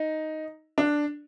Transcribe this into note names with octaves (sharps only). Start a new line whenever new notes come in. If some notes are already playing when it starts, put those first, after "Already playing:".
Already playing: D#4
D4